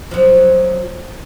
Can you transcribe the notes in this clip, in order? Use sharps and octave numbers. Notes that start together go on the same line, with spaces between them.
F3 F#3